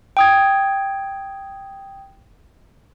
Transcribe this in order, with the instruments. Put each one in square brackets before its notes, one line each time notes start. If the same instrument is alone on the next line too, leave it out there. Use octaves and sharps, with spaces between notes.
[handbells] G5 D#6 G#6